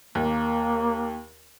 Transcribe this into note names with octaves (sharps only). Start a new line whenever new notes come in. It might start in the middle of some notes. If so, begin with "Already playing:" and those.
D#2 A#3